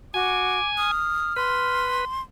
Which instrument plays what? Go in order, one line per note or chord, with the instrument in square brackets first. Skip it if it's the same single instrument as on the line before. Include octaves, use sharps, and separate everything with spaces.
[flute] F#4 [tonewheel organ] G#5 [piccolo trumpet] D6
[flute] D#6 [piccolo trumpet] F6
[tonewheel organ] B4 [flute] C6